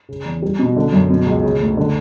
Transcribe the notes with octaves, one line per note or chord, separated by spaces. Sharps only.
C#3
E2
G3
B2
D3
F#2
B2
C#2
C#3
D2
D3